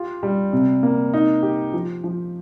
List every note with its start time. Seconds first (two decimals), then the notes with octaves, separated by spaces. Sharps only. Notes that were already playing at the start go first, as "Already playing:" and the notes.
Already playing: F4 G4
0.23 G3
0.53 C3
0.83 A#3
1.14 D#4
1.43 G4
1.73 F3
2.04 F3